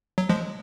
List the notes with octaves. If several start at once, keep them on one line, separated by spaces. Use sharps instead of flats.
F#3
F3 G#3